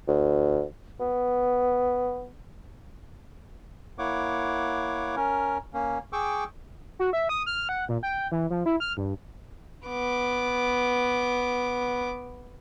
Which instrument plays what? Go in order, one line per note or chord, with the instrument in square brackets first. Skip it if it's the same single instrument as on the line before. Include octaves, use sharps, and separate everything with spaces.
[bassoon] D2
B3
[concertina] A#3 E4 C#5 F#5 D6
C#4 A#4
A#3 C#4
G#4 G5 C#6 D6 E6
[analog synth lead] F#4
E5
D#6
F6
F#5
A#2
G5
E3
F3
E4
F6
G2
[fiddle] B3 D6